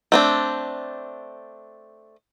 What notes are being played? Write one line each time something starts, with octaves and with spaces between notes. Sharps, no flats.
A3 C4 D4